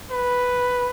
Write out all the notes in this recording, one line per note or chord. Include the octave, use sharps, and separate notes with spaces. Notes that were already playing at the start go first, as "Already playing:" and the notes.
B4